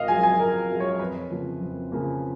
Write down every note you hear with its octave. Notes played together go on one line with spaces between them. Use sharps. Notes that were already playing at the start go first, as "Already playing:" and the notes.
Already playing: G#1 D#5 F5
F#2 F3 G#3 G#5
G#5
G#1 A#4
F#2 F3 G#3
C#5
F2 B4
C#3 F3 A#3
F2
C#3 F3 A#3